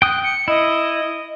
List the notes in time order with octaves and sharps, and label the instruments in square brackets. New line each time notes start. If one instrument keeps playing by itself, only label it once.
[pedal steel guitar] G5 D#6 [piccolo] F#6
[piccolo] C#7
[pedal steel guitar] E4 [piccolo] D#5